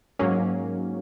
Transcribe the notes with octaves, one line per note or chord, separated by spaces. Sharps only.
G#2 F#3 A#3 C#4